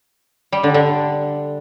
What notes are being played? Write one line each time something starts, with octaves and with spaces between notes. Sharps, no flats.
G3
D3
D3